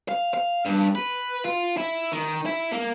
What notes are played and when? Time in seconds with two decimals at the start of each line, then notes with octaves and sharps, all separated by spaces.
0.09 F5
0.34 F5
0.65 G2
0.95 B4
1.44 F4
1.77 E4
2.12 D#3
2.46 E4
2.71 A#3